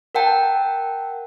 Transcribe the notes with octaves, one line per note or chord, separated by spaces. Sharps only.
A#4 F#5 G5 A5